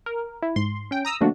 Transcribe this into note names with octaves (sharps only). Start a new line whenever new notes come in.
A#4
E4
G#2 C6
C#4 G5
A#5 D#6 E6
D3 F3 A3 A#3 D4 F#4